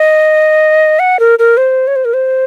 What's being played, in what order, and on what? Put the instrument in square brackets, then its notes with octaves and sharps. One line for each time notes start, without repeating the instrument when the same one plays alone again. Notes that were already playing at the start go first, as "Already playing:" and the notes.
Already playing: [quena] D#5
F#5
A#4
A#4
C5
C#5
C5
A#4
C5